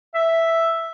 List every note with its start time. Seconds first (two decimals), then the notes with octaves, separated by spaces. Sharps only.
0.15 E5